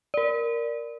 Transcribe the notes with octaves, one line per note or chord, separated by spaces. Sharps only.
A#4 D5